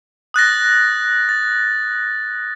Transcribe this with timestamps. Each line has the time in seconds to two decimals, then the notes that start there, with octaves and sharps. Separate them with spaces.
0.34 D#6 F#6 A6 A#6
1.29 A6